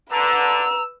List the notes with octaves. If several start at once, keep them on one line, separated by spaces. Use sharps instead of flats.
D3 B4 A#5 E6